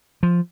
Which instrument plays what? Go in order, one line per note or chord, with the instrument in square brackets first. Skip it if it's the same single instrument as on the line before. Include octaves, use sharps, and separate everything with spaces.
[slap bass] F3